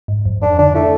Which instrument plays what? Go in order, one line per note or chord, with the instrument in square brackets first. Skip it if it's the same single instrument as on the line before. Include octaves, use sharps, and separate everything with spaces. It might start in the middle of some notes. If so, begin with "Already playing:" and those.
[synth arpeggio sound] G#2
F2
[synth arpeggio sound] F2 [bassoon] D4
[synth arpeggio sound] D3 [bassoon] D4
[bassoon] A3 [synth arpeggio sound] E4